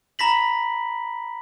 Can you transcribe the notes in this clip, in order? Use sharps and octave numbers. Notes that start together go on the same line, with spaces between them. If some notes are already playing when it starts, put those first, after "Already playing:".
A#5 B5 A#6 B6 F#7